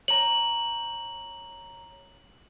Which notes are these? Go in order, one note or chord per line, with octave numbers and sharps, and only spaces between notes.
C#5 A#5 F#7